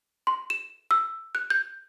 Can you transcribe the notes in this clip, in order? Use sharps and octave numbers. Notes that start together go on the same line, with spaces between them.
C6
E7
E6
F#6
G6